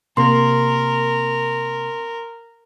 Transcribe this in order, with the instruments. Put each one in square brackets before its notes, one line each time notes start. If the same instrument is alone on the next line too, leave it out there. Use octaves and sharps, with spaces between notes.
[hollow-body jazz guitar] C3 A#3 [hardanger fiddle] A#4 [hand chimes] C6